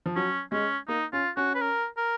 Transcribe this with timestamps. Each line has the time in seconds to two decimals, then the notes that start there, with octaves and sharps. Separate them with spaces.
0.06 F3
0.16 F#3 C#4
0.52 G#3 C#4
0.88 A#3 D#4
1.13 C#4 F4
1.37 C#4 F#4
1.55 B4
1.61 A#4
1.97 A#4